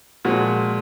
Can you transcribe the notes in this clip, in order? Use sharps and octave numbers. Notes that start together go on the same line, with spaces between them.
A#2 F3 G#3 F#4